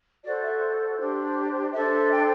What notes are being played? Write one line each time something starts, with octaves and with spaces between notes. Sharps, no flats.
F#4 A4 C5 D5
E5
D4 G4 C5
D4 A4 C5 E5
G5